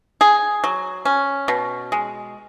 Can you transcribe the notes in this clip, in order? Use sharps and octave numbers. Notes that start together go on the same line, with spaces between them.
G#4
F#3
C#4
B2
G#3